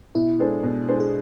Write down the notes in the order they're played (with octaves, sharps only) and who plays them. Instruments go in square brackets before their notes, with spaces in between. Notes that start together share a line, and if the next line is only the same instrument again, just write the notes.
[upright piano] B2 [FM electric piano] E4
[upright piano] G#3 D4 A4 C5
B2
G#3 D4 A4 C5
[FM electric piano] G#4